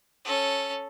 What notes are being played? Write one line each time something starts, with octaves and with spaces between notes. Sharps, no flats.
C#4 A4